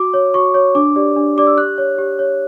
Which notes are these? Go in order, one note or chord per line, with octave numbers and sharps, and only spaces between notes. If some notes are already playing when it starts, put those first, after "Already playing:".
Already playing: F#4 D6
C#5
F#4 C#6
C#5
D4 D6
G4 D5
D4
G4 D5 D6
E6
G4 F#6
C#5
G4
C#5